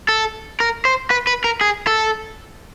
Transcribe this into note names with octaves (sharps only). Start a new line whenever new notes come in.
A4
A#4
C5
B4
B4
A#4
G#4
A4